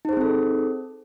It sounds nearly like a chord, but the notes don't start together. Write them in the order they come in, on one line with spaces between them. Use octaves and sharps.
D#4 C5 G#4 C4 A4